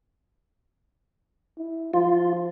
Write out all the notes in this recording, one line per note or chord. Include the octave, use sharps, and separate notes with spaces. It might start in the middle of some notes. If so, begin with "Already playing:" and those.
E4
F3 F4